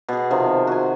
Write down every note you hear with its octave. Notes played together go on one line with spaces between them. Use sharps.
B2 G#4
C3 D#3 F3
F#4 G#5